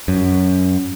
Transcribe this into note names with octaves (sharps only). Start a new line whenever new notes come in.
F#2